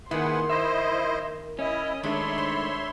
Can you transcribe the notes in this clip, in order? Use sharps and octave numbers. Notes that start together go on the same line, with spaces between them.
D#3 A#3 D#4 E4 G#4 B4 F#5 C6
E4 C5 D#5 E5
C#4 E4 D#5 E5
D#3 G#3 A3 D4 C#5 E5 B5 C6
C5